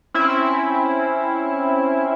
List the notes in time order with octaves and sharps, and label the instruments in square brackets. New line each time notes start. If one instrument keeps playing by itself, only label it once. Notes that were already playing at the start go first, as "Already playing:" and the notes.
[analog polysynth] C4 C#4 E4